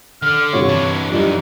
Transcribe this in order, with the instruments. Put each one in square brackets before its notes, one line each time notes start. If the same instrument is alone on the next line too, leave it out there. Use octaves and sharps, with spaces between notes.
[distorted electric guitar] D3 [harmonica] F6
[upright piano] G2 C3 F#4 [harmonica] C#5
[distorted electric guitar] E3 D4
[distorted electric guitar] F#2 E3 [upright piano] F3 G3 D4 [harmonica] D#4